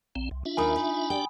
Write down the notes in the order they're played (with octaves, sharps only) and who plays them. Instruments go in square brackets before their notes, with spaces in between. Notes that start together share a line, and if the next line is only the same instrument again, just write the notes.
[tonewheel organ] A#1 C4
C2
D4 F4 E5
[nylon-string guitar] D#2 D#4 A#4 [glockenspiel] G#5 B5 D#6
[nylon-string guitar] D#4
[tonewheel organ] D4 G4 D5 [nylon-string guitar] G5